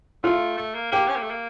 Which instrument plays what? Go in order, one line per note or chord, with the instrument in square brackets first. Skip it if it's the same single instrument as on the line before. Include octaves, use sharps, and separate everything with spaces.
[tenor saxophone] A3 [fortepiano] F4
[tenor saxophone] A3
A#3
[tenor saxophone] A#3 [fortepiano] G4
[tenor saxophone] C#4
A#3
A3
A#3